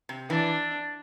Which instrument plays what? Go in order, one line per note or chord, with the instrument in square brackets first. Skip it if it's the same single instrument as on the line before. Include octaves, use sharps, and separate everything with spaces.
[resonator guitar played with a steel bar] C3
[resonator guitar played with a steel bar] E3 [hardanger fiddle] D4